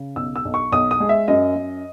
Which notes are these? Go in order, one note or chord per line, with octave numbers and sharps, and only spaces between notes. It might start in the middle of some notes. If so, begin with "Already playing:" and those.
Already playing: C#3
B1 E6
E6
B1
C#6
B1 D#6
D#6
G#3
E5
F#2 D#5
F#2